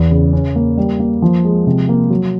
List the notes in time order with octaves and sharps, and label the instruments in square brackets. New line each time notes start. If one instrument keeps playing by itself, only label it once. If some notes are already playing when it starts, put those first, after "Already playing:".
Already playing: [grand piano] E2
C#3
C#4
A#3
G3
A#3
F3
G#3
C3
A#3
F#3